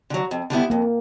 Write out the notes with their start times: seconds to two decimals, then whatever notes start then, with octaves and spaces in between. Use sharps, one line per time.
0.10 D3 F#3
0.31 F2
0.50 D3 G3 B3 E4
0.70 F2 A#3